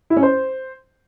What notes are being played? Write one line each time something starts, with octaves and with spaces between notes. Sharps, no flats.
E4
C#4
C5